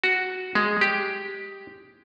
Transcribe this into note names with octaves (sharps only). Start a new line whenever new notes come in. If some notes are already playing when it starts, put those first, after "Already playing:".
F#4
G#3
G4